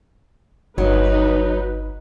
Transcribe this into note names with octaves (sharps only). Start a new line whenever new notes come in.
G1 F#3 D#4 B4